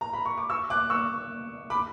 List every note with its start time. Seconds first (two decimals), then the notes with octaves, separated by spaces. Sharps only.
0.01 A#5
0.13 B5
0.25 C#6
0.38 D6
0.50 C#6 E6
0.70 D6 F#6
0.90 C#6 E6
1.70 B5 D6